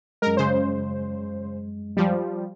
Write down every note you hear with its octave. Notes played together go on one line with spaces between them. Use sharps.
F#2 G#3 A#4
C#3 C5
F3 G3